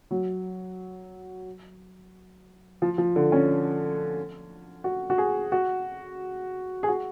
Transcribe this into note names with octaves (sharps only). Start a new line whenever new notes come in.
F#3
F3
F3
D3
C#4
F#4
F#4
G#4
F#4
G#4
F#4